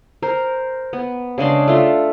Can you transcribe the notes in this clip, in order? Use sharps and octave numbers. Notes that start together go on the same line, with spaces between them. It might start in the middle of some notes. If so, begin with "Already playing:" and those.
A#4 C5
B3
C#3 G#3 D4 C6
A3 F4 C6